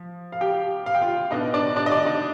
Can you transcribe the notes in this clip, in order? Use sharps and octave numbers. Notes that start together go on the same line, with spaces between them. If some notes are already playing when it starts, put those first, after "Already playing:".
Already playing: F3
F5
G4 G5
F5
G5
F4 F5
B2 B3 D4 D#4 D#5
D4 D5
D4 D5
D#5
D4 D5
D#4 D#5